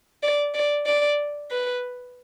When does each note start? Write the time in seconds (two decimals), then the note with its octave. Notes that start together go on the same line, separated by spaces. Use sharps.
0.23 D5
0.54 D5
0.86 D5
1.51 B4